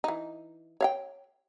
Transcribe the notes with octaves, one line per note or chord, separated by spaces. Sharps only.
E3 D#4
C#5 F5 G5